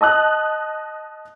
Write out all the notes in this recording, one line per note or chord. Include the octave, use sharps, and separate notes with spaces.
D#5 A5 D#6 F#6